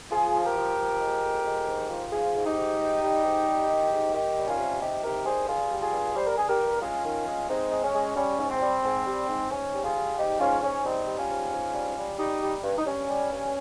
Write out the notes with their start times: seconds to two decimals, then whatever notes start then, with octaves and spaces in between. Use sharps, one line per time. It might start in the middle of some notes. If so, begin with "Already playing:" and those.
0.11 F3 F4 G#4
0.34 F3
0.45 G4 A#4
0.57 F3
0.78 F3
1.00 G#3
1.23 F2
1.46 G#3
1.68 G#2
1.90 F3
2.12 G#2 F4 G#4
2.35 G#2
2.46 D#4 G4
2.57 G#2
2.79 G#2
3.03 G3
3.24 G#2
3.47 G3
3.69 D#3
3.91 G#2
4.13 D#3 D#4 G4
4.37 G3
4.48 C#4 F4
4.58 C3
4.81 C3 D#4 G4
5.03 D#3 G4 A#4
5.25 G3 G#4 C5
5.48 G2 F4 G#4
5.70 G3
5.82 F4 G#4
5.92 G2
6.15 G3 C5
6.26 A#4
6.37 G2 G#4
6.48 G4 A#4
6.60 G2
6.82 G#3 C#4 F4
7.04 D#3
7.26 G#3
7.49 G#3 C4 D#4
7.71 G#3
7.83 C#4
7.94 G#3
8.16 G3 C#4
8.38 G#2
8.50 C4
8.61 G3
8.83 G#2
9.06 G3
9.28 G#2
9.50 G#2 C#4
9.73 G3
9.84 F4 G#4
9.96 G3
10.17 G#2 D#4 G4
10.40 G#2 C#4 F4
10.62 G#2 C#4
10.84 G3 C4 D#4
11.07 G3
11.19 C#4 F4
11.29 G#2
11.52 G#2
11.74 G3
11.97 G3
12.18 G3 D#4 G4
12.42 G3
12.63 G2
12.78 D#4
12.86 G2 C#4
13.09 G3
13.31 G2